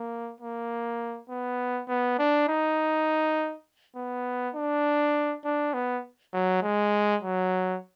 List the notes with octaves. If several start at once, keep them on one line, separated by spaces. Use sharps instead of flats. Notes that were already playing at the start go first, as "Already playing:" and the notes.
Already playing: A#3
A#3
B3
B3
D4
D#4
B3
D4
D4
B3
F#3
G#3
F#3